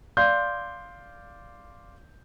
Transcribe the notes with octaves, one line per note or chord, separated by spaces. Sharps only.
D5 F5 C6 G6